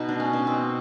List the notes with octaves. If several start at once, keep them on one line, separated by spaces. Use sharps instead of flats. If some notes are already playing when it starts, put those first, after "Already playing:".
Already playing: B2 D#4
D4
C#4
B2
C4